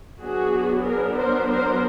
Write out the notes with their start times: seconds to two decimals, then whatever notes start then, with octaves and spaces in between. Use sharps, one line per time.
0.20 F#3 B3 D4 F#4 G#4
0.84 G#4 A#4
1.16 A#4 C5
1.48 A#4 C5